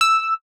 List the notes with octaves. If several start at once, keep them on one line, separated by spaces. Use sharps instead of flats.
E6